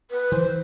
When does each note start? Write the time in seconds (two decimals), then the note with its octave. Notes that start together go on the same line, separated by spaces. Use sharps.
0.11 B4
0.32 E3 C5